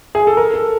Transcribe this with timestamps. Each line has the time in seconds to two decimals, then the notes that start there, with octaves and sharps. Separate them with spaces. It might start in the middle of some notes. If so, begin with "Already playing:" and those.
0.15 G#4
0.27 A4
0.37 A#4
0.54 A4